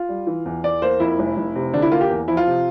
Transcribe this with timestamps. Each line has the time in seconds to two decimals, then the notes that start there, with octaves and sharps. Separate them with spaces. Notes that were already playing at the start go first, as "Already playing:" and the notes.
Already playing: F4
0.09 G3
0.27 E3
0.45 E2
0.63 E2 D5
0.82 A#3 C5
1.00 F2 E4
1.19 F1
1.37 F1
1.56 C3
1.74 D3 D4
1.82 E4
1.91 A#3 F4
2.01 G4
2.10 E2
2.28 F3 E4
2.37 F4
2.47 C3